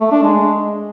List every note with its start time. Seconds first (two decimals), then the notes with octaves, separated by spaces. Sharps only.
0.01 A3
0.12 D4
0.23 G#3